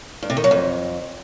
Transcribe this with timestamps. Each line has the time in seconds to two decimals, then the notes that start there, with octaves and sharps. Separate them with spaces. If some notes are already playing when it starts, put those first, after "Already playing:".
0.23 G2
0.30 C3
0.37 D#3
0.44 F#3
0.51 F2